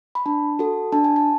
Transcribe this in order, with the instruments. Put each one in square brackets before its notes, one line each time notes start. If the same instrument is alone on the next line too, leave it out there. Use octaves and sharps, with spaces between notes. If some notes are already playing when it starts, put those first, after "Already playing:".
[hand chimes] B5
D4 A5
F#4 A4
D4 A5
G#5
A5